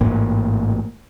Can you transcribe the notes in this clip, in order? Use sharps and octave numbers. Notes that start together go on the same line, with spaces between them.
A1 G#2 A#3